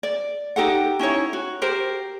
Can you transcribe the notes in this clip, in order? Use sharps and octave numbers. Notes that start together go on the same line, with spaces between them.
D5
D#4 G4 A4 F#5
C#4 D#4 E4 C#5
F#4
G4 A#4 C5